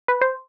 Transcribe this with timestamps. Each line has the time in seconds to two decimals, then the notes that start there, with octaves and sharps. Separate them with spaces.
0.08 B4
0.21 C5